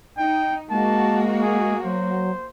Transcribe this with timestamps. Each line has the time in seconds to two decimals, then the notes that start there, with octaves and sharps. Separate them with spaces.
0.18 D#4 G5
0.70 G#3 A#3 F#4 A5
1.42 G#4
1.84 F#3 C5